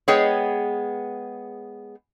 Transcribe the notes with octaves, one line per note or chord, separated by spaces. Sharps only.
G#3 B3 G#4 C#5 G5